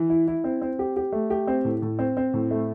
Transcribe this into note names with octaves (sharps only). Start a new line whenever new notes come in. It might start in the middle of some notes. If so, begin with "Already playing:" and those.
Already playing: E3
E4
E4
C4
C4
G4
G4
A3
G4
C4
A2
A2
C4
C4
A2
A3